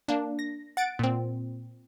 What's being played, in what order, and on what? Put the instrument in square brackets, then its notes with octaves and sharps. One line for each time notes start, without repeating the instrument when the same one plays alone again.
[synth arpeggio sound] A#3 D4
A#6
F#5 A6 D7
A#2 C4